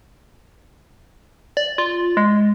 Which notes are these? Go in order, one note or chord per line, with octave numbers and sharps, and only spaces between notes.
D5
F4
G#3